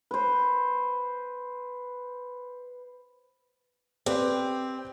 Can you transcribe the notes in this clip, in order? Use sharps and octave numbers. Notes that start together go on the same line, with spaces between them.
B4 C5
C4 G4 B4 D5